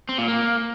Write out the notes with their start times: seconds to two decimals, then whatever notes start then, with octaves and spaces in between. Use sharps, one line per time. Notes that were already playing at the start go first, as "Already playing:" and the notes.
0.09 C4
0.18 A#2
0.28 A#3